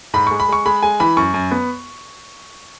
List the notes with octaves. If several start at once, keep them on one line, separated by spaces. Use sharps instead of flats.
G#2 B5
G#3 C#6
B5
G#3 C#6
G#3 B5
G#3 G#5
E3 B5
F#2 C#6
F#2
B3